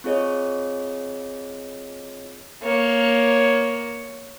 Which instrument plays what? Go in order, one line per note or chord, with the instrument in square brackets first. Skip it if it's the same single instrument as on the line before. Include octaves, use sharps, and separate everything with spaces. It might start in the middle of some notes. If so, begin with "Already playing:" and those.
[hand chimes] C4 F4 G#4 C#5 D#5
[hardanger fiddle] A#3 C#5